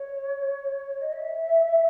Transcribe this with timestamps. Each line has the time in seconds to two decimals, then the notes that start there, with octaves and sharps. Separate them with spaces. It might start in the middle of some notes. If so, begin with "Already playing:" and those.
Already playing: C#5
1.01 D#5
1.12 E5